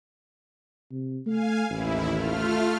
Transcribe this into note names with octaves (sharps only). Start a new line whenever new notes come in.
C3
A3 F5 G#5
A1 D#2 E4
A3 F4 F6